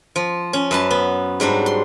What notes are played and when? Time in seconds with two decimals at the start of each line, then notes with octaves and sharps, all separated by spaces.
0.16 F3
0.53 C#4
0.71 F#2 B4 A5
0.91 B3
1.40 G#2 F#3 G3 D4
1.66 C6